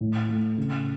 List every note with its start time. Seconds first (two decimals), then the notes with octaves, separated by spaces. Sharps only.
0.01 A2
0.29 A3
0.58 C#3